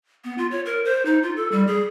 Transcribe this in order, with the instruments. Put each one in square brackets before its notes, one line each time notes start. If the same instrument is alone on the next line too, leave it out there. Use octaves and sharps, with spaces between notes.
[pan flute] B3
F4
C#5
A#4
C5
D#4
F4
A4
G3
G#4